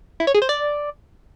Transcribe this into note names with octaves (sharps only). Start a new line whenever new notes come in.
E4
C#5
G#4
C5
D5